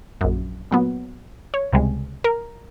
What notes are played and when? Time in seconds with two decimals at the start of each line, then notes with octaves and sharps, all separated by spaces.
0.21 A#1 F#2
0.71 A#2 F#3 B3
1.54 C#5
1.73 C#2 C3 G3 G#3
2.24 A#4